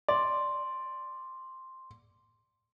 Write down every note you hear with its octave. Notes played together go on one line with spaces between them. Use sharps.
D5 C6